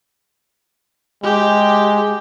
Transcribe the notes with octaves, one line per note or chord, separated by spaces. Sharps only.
G#3 G4